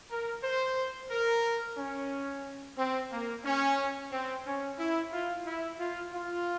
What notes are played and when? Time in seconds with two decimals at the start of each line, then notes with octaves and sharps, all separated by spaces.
0.10 A#4
0.44 C5
1.11 A#4
1.78 C#4
2.78 C4
3.11 A#3
3.45 C#4
4.12 C4
4.45 C#4
4.78 E4
5.12 F4
5.46 E4
5.79 F4
6.13 F4